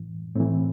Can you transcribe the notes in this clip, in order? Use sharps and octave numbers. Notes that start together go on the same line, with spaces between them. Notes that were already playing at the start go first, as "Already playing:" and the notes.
Already playing: A2 E3
A2 E3 C4